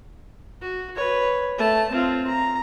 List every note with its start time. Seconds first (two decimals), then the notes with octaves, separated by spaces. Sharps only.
0.62 F#4
0.96 B4 C#5
1.58 A3 A5
1.91 C4 F4
2.27 A#5